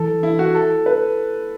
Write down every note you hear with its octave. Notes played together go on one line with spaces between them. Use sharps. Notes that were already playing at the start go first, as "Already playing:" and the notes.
Already playing: E3 A4
E4
F#4
A4
B4